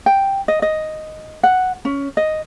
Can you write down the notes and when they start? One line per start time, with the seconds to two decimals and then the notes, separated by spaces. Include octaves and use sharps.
0.06 G5
0.48 D#5
0.62 D#5
1.43 F#5
1.85 C#4
2.17 D#5